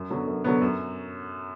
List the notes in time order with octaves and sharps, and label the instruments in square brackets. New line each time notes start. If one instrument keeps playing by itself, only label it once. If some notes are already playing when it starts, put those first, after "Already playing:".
Already playing: [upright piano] F#2
D3 F#3 B3
F#2
D3 F#3 B3
F#2